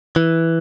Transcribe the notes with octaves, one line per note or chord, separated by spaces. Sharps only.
E3